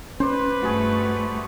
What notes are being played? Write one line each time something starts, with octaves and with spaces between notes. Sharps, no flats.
C#4 B4 C5 D5
G2 A3 F#4 G#4 A5